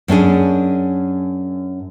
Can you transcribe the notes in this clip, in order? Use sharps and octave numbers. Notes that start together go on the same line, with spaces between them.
F#2 C#4 D4 G#4